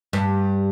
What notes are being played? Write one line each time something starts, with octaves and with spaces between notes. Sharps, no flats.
G2